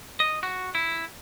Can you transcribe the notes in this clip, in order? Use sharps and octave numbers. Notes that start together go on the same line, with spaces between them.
D#5
F#4
E4